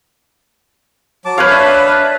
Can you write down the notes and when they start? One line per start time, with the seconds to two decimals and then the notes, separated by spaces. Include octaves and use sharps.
1.25 F#3 A5 D6
1.38 B4 C#5 F5
1.50 D4 E5 A5